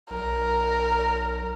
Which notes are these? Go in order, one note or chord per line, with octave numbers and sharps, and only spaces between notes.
B1 A#4